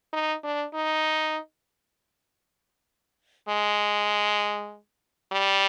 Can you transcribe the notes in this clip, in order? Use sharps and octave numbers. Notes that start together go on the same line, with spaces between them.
D#4
D4
D#4
G#3
G3